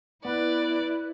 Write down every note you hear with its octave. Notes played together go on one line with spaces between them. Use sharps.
B3 E4 B4 D5